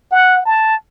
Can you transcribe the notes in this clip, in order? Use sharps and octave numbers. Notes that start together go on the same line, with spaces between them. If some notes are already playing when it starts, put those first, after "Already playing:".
F#5
A5